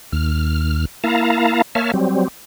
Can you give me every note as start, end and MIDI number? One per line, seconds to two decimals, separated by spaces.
0.12 0.85 39
0.12 0.85 89
1.04 1.62 58
1.04 1.62 64
1.04 1.62 77
1.04 1.62 81
1.04 1.62 82
1.75 1.92 58
1.75 1.92 73
1.75 1.92 76
1.75 1.92 81
1.75 1.92 89
1.94 2.28 54
1.94 2.28 55
1.94 2.28 60